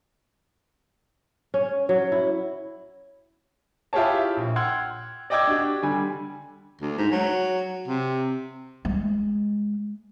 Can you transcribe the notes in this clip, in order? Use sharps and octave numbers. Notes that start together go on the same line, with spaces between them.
C#4
F#3
E4
E4 F4 G4 G#4 C#5 A5
A#1
F#5 G5 C6 E6 F6 G#6
D5 D#5 G5 D6 E6 G#6
D4 F#4 G4
D3 G3 G#5
D2
G#2
F#3
C3
G#3